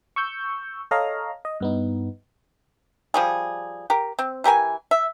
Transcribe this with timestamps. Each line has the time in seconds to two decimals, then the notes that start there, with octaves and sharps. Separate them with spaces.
0.16 C#6 E6 G6
0.91 A4 C#5 D#5 F5 A#5
1.45 D#5
1.60 G2 B3 D#4
3.14 F3 G3 G#4
3.90 G4 A#4
4.19 C4
4.44 E3 G4 A#4 G#5
4.91 E5